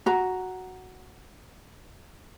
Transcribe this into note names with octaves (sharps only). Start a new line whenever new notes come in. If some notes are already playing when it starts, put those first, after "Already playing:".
F#4 A#5